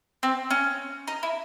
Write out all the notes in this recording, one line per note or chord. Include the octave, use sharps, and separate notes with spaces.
C4
C#4
D#4
E4